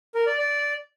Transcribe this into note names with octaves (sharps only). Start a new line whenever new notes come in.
A#4
D5
D5